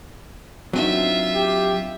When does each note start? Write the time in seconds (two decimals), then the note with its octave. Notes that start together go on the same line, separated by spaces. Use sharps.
0.73 F#3 C4 D4 D#4 F4 E5
1.34 G4